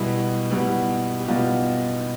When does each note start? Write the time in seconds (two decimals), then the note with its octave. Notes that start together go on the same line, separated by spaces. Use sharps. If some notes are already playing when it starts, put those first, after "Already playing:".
Already playing: B2 G3 B3 E4
0.50 B2 G3 B3 E4
1.20 G4
1.28 B2 G3 B3 F4